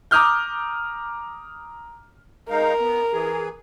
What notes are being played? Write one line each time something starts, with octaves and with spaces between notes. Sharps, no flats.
A#5 D6 D#6 F6 G6
G#3 D#4 A#4 F5
B3
E3 G#4